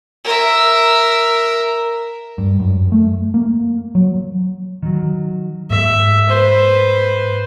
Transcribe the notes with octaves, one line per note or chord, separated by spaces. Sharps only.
A#4 E5
G2
F#2
A3
A#3
F#3
D#3 F#3
G#2 E5
B4 C5